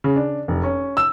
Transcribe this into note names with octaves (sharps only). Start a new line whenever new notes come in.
C#3
D4
F1
C#4
E6